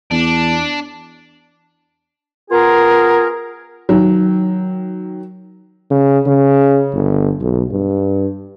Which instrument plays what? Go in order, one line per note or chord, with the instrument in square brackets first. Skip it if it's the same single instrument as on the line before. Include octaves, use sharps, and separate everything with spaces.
[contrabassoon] E2 [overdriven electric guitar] D4
[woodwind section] B3 F4 G#4 A#4
[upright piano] D#3 F#3
[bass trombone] C#3
C#3
G1
B1
G2